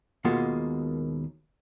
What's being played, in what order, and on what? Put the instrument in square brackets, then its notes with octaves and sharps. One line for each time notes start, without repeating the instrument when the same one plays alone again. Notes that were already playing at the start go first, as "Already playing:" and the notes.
[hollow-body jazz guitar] D#2 B2 G#3 A#3 F4 F#5